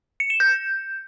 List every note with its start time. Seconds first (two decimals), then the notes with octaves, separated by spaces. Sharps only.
0.20 C#7
0.30 E7
0.40 G6